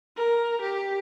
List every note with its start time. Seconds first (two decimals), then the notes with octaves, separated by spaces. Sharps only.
0.17 A#4
0.62 G4